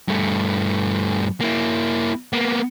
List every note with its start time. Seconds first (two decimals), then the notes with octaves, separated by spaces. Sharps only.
0.08 G2 A3
1.41 A#3 E4
2.33 A#3 B3